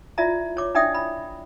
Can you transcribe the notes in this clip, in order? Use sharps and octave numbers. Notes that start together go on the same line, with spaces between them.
E4 F4 D5 E5 A#5
C#5 D6
D4 E4 D5 E5 G5 D#6
B5